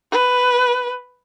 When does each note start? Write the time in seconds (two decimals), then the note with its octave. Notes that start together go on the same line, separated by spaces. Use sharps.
0.12 B4